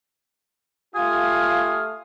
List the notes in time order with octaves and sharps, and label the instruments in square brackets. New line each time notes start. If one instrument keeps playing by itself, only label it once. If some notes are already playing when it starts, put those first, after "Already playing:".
[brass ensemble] A3 G4 F5 [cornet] F4 [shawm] G#5 [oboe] D#6